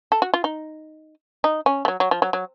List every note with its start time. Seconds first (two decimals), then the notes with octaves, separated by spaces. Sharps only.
0.12 A4
0.22 F#4
0.34 F4
0.44 D#4
1.44 D#4
1.66 C#4
1.85 A3
1.88 F#3
2.00 F#3
2.11 F3
2.22 F#3
2.33 F#3